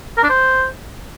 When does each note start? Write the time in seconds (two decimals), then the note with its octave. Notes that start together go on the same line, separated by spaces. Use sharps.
0.18 A#4
0.24 D4
0.30 C5